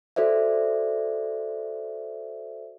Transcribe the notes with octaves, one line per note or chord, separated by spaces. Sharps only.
F#4 A4 C5 D5 E5